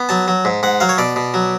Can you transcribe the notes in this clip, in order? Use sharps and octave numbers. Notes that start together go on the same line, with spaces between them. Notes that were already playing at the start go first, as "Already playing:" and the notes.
Already playing: B3
F#3 A5
F#3
G#2
G#2 F#5
F#3 F5
C#5
B2 D5
B2
F#3